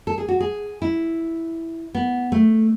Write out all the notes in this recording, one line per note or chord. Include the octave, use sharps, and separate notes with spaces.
A4
G#4
F#4
G#4
E4
B3
A3